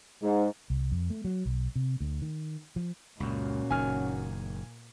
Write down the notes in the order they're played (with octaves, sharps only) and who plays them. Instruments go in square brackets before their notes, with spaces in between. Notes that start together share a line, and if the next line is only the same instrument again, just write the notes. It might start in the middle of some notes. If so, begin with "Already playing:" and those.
[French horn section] G#2
[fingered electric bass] C2
F2
A3
F#3
B1
C3
D2
D#3
F3
[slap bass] C#2 F#2 [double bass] A#2 [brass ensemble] C#4 F#4
[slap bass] F#1 D#3 [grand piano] G#5 F6